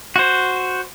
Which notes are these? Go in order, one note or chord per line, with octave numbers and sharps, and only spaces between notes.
F#4 C5